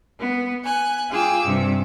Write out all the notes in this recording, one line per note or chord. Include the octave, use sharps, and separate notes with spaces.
B3
G#5 F#6
F4 G#4 G5 D6 E6
G2 C3